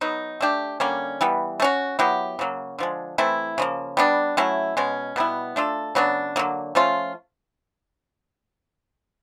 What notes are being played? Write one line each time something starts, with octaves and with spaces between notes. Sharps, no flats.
F#3 B3 D#4
A3 D4 G4
D3 G3 A#3 C#4
E3 G3 B3
A3
C#4 F#4
F#3 B3 E4 G4
C#3 F#3 A#3
D3 F3 G#3
E3 A3 C4 E4
C#3 F3 A#3
G3 B3 D4
F#3 A3 C#4 E4
B2 G#3 C#4
B2 G3 B3 E4
A3 D4 F4 A4
C#3 F#3 B3 D4
D3 F#3 A#3
F3 A3 C#4 F4